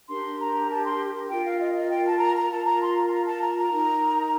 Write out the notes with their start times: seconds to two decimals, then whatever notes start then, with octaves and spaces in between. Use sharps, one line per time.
0.08 D4 G4 A#4 C6
0.38 A#5
0.70 A5
0.85 C6
1.29 F4 A#4 G5
1.45 F5
1.59 D#5
1.75 D#5
1.90 G5
2.05 A5
2.19 A#5
2.36 A#5
2.50 F4 A#4 A5
2.65 A#5
2.81 C6
2.96 A#5
3.07 A5
3.11 A#5
3.26 A5
3.41 A#5
3.56 A#5
3.71 D#4 A#4